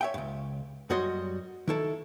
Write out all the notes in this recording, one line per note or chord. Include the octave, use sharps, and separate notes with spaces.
C#5 E5 G5
C#2 G2
F#2 G3 F#4 C#5 D#5 C6
D#3 E4 A4